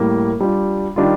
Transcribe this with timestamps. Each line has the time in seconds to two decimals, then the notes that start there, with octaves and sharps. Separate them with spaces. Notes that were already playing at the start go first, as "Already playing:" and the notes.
Already playing: A2 G3 A#3
0.40 G3 D4 F4
0.96 D#3 G3 D4 F4